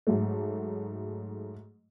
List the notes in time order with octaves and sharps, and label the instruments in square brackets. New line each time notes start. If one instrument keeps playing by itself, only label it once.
[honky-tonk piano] G#2 F#3 A3